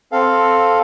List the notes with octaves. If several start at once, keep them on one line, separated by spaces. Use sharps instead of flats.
C4 A4 F5